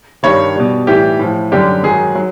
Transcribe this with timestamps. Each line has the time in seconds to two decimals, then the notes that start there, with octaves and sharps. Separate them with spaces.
0.23 G2 D#3 G3 C#5
0.56 B2 G3
0.87 A2 E3 G3 G4
1.19 A2 F3
1.52 F#2 D3 G3 G4
1.83 G#2 D#3 F#3 G#4
2.15 F#3